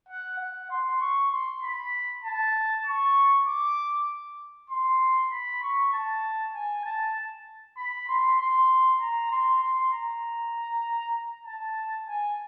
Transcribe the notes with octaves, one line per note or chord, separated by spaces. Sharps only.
F#5
F#5
C6
C#6
C6
B5
A5
C#6
D6
C6
B5
C#6
A5
G#5
A5
B5
C6
C6
A#5
C6
C6
A#5
A5
G#5